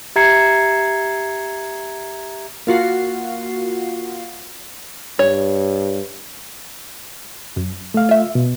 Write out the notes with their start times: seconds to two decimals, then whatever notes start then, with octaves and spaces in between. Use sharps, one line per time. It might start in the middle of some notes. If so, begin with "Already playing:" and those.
0.16 G4 E5 A#5 G#6 C7 C#7
2.67 A#3 F4 F#4 C7
5.19 G2 C#5
7.56 F#2
7.94 A3 F5
8.09 F4 E5
8.35 B2